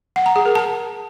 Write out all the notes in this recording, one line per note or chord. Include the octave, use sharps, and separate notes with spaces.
F#5
A#5
G#4
A#4
A5